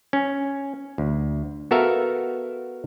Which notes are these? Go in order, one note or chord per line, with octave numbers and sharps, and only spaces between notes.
C#4
D2
B3 F#4 A4 A#4 E5 F5